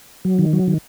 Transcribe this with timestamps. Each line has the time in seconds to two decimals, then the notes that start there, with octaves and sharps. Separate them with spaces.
0.25 F#3
0.39 D#3
0.53 F#3
0.68 D#3